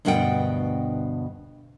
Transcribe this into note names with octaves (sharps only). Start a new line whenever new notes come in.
D2 G2 B2 D4 F#5 G5